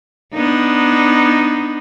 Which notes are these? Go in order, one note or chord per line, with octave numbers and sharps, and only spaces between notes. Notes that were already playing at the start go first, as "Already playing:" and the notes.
B3 D4 D#4